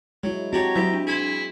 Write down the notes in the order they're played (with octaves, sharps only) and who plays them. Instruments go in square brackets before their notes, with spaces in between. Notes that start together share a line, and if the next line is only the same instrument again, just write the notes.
[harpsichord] F#3 [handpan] G#3 E4
[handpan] C4 F#4 [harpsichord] D4 G4 C#5 [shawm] A#5
[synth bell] F#3 E4 [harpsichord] G4 E5
[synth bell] D4
[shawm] E4 [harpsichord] G#4 B5 C6